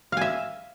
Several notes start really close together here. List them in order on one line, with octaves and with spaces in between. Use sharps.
F5 G#5 E5